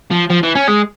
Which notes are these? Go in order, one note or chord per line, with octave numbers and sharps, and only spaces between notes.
F3
F3
E3
C#4
G#3